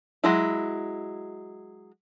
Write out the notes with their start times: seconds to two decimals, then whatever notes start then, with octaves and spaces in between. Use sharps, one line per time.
0.24 F#3 G#3 E4